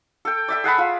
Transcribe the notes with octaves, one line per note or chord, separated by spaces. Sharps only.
A4 G5
D5 E5 G5
G#4 F#5 A5 B5
F4